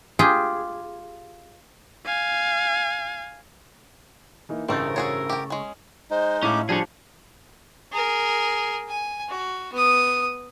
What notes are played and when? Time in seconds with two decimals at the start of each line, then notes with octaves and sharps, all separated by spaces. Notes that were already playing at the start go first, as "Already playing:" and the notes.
0.19 F4 G4 G#4
2.06 F5 G#5
4.49 E3 A#3 D#4
4.68 A1 G2 C#3 A3 C4 D#4 A#4 C5
4.96 F#4 G#4 C#5
5.30 G4 G5
5.50 G#3 C#4
6.11 G#3 D#4 C5
6.43 A2 A3 C#4 F5 D6
6.69 F3 G3 D4 F4 G#4 C#5
7.92 G#4 A#4
8.88 G#5
9.29 F#4
9.73 B3 D#6